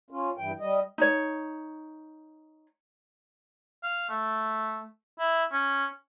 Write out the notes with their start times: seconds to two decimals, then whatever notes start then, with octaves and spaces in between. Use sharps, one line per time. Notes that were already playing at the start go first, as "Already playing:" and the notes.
0.10 C#4 F4
0.37 G2 E3 G5
0.60 G3 D#5
0.98 D#4 C#5
3.83 F5
4.09 A3
5.19 E4
5.52 C#4